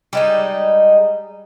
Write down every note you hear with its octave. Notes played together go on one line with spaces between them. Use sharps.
G3 G#3 D#4